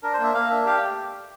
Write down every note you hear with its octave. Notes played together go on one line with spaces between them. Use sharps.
D4 A#4
C5
A#3 E5
A#3 F5
D4 E5
G4 F5
G5
A3